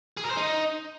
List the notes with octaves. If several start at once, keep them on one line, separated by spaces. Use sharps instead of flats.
G#4
A#4
C5
D#4